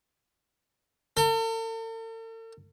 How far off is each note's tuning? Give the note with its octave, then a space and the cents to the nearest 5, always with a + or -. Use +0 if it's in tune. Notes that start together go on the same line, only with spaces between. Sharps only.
A4 +45